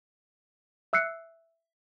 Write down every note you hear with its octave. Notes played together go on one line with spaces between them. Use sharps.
E5 E6 F#6 C7 C#7